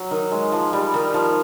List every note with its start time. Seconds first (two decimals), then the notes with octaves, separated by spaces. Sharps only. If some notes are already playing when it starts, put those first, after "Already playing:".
Already playing: F#3
0.11 D#3
0.32 G#3
0.52 F3
0.73 G3
0.94 D#3
1.14 F3